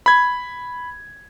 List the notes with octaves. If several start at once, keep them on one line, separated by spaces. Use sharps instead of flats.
B5 G#6